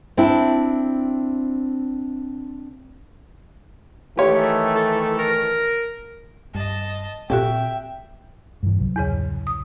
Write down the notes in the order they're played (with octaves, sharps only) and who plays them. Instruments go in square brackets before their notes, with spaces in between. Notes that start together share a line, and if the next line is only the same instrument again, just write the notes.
[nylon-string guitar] C4 D4 E4 A5
[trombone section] D#3 E3 A3 [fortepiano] G4 C#5
[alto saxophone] A4
A#4
[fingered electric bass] G2 [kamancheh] D#5 A5
[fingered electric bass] A#2 C4 [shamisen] F#4 G4 A4 [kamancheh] E5 [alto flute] G5
[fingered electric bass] G2 E3
C2 F#3
[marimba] E2 G#2 C#3
D#6